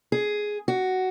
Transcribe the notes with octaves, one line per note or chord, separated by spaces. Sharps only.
G#4
F#4